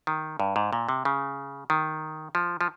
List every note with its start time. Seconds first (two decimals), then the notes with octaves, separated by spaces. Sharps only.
0.07 D#3
0.40 G2
0.56 G#2
0.73 A#2
0.89 C3
1.05 C#3
1.70 D#3
2.35 F3
2.61 F3